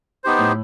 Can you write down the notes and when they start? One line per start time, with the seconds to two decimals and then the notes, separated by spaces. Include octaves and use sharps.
0.24 B3 D#4 G4 C5
0.38 A2